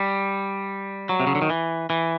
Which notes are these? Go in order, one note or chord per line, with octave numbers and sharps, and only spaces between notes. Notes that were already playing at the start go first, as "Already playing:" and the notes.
Already playing: G3
F#3
C3
C#3
D3
D#3
E3
E3